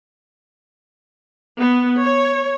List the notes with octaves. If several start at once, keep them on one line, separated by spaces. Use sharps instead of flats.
B3
C#5